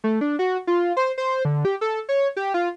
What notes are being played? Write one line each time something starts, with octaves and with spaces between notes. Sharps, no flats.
A3
D4
F#4
F4
C5
C5
D3
G4
A4
C#5
G4
F4